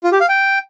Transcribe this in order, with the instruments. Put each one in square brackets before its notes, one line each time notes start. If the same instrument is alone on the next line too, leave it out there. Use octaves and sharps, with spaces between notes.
[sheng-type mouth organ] F4
G4
F5
G5